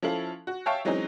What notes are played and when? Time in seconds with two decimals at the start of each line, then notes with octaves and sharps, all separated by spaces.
0.02 F3 C#4 E4 A4 F5 F#7
0.47 F#4
0.66 C#5 E5 F5 G5 A5 C#6
0.85 E3 F#3 G#3 C4 C#4 D#4